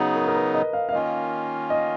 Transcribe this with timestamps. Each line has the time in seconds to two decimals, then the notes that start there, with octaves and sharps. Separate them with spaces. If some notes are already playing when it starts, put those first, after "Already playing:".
Already playing: C#3 F#3 B3 D#4 F#4
0.16 A#4
0.27 A#4
0.35 B4
0.54 D#5
0.73 F5
0.89 F5
0.93 D#3 A#3 C#4 F4 D#5
1.70 D#5